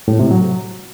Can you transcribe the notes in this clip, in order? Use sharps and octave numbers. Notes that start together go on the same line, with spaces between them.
A2
C3
F#3